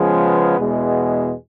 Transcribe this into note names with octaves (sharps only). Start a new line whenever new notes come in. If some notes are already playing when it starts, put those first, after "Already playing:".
Already playing: C#3 F3 G#3 B3
E2 B2 G#3